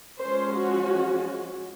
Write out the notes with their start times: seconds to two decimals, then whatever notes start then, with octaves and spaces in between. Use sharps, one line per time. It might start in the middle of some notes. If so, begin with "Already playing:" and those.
0.21 F3 G#3 C#4 C5
0.53 F#4